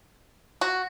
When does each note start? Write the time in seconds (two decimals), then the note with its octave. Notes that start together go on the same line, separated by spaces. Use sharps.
0.61 F#4